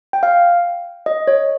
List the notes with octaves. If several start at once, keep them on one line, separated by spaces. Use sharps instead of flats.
G5
F5
D#5
C#5